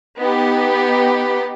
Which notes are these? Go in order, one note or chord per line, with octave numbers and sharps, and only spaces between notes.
B3 D#4 G4